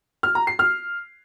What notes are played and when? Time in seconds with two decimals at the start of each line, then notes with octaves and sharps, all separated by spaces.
0.23 F6
0.35 A#5
0.47 C7
0.59 F6